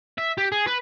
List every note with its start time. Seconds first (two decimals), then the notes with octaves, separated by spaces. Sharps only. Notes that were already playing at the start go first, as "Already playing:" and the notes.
0.18 E5
0.37 G4
0.52 G#4
0.67 B4